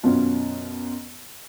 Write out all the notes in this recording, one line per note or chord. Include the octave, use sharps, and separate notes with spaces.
F#2 B2 B3 C#4 F4